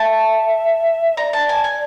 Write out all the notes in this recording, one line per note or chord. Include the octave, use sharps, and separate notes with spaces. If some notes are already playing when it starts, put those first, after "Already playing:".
Already playing: E5 A5
D5 A#5
A5
G#5
G#5